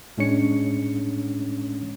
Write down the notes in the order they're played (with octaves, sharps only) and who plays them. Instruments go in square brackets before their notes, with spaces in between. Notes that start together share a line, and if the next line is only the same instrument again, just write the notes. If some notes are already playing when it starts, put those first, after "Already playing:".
[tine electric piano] A2 G#3 C#4 D4 C#5 C#7